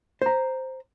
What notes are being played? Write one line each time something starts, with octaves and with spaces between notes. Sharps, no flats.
C5 A#5